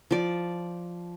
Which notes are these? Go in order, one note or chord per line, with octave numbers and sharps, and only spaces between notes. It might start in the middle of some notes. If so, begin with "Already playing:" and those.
F3 D5